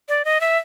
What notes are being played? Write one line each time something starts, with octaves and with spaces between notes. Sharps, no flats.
D5
D#5
E5